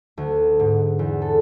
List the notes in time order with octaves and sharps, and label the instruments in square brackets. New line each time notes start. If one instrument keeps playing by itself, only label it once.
[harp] D2
G#2
E2
A4